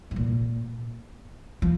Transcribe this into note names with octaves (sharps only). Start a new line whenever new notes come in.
G#2
A#2
F3